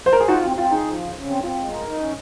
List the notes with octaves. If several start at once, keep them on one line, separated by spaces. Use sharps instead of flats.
C5
A#4
G#4
D#4 F4 F#4
C4
C4 F4
D#4 G#4
F3
C#3
C#3
C4
C4 F4
G#3
A#4
D#4
C#4